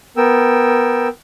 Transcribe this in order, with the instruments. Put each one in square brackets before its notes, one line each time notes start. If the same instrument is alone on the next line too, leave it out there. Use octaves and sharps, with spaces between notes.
[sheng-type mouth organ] B3 A#4 G5 E6